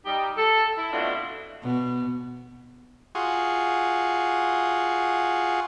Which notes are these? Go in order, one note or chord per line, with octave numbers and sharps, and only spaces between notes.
G3 D#4 G4
A4
E4
B2 A3 C4 D4 E4 F4
B2
F4 F#4 G#4